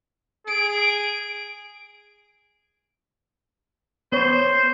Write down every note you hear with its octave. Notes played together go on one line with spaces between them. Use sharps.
G#4 D7
B3 C5 C#5